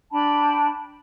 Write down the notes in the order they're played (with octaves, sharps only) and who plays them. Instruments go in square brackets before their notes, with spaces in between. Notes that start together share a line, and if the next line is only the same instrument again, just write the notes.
[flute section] D4 G5 A5 B5